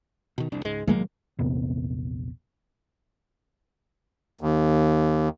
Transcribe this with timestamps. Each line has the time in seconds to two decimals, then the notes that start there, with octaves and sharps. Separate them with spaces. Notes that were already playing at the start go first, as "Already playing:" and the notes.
0.38 B2 D#3
0.52 F1 C2 D4
0.65 C#2 G#2 G#3
0.87 A#1 D#3 F#3 G#3 A#3
1.39 A#1 E2 C3 B3
4.41 D#2